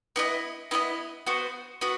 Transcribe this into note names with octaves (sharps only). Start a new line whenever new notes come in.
B3 E4 A4 D#5
B3 E4 A4 D#5
B3 F#4 C5
B3 F#4